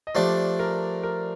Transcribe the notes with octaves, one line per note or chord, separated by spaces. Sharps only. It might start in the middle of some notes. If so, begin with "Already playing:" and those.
D#5
F3 A3 D4 G4 D5
A#4
A#4